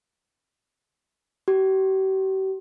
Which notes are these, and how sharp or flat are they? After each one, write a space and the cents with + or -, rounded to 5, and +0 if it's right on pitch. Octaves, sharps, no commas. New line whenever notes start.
G4 -45